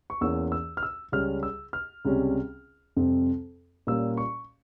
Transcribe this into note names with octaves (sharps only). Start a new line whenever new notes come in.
C#6
E2 E3 A#3 C#4 E6
E6
F6
E6
C#2 C#3 G3 C#4 F6
E6
F6
C#2 C3 G3 C#4
F2 C3 G3 C4
A#2 G3 A#3 C#4 E6
C#6